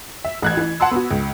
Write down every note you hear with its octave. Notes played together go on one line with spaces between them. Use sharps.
E5
A1 F#6 G#6
E3
F#5 A5 C6 E6
B3 F#4
C#2